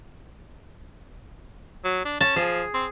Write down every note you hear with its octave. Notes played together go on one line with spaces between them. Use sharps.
F#3
D4
C#4 A5
F3 G#4
C4